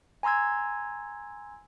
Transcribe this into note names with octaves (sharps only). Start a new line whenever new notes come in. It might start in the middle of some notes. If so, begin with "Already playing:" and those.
G#5 A#5 C6 E6 G#6